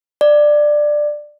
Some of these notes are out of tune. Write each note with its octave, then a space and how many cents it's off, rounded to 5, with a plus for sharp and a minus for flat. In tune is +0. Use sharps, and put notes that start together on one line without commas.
D5 +15